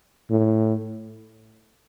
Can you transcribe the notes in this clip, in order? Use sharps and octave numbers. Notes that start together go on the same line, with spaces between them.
A2